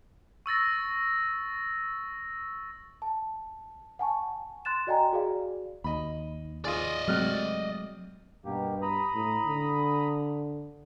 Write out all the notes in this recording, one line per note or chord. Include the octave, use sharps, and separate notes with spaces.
C#6 E6 A6 A#6
A5
F#5 G#5 A5 C#6
C6 F#6 A6 E7
F#4 D5 D#5 G5 G#5 A#5
F#4 G#4 D5 F5
D#2 D#5 B5
F4 G#4 D5 D#5
C3 F#3 G#3 A3 F6 F#6
G2 B2 A#3 G4
A#5 B5 D#6
A2
D3